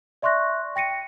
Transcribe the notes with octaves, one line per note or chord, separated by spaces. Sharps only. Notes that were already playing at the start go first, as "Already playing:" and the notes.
D5 E5 C6 C#6 F#6 A#6
G5 A#6 C#7 D#7